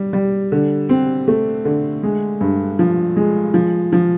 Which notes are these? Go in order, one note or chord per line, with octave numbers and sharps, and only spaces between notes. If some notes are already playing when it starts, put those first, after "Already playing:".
Already playing: G3
G3
D3
C4
A3
D3
G#3
G2
F3
G#3
F3
F3